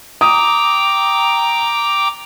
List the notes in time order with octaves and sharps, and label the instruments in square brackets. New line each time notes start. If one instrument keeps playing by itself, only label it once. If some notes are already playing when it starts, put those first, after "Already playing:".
[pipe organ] G5 A#5 D6 [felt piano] D#6